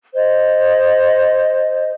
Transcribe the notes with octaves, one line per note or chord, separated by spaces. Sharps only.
C5 D#5